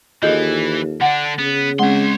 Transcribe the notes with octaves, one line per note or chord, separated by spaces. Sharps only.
D#2 E3 F4 G#4 A4 D#5 G6
D3 D4 F#5
C#3 B3
G#3 C4 C#4 C#5 F#5 C6